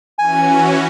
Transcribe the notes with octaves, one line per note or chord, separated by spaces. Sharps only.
E3 C#4 F#4 G#5